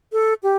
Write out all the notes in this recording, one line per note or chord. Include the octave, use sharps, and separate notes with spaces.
A4
G4